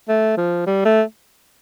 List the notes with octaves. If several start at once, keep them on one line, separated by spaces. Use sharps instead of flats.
A3
F3
G3
A3